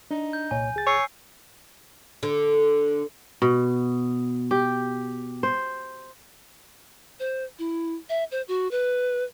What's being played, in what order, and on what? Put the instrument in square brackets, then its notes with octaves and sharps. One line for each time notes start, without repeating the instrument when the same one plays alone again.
[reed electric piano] D4 [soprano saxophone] D#4
[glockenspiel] G6
[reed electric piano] C2 A#2 C#5 [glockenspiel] G#5
[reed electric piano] C#2 G#4 A6
[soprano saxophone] C#5 [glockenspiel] G#5 E6 C7
[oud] D3
[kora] B2
G4
C5
[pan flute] C5
E4
E5
C5
F#4
B4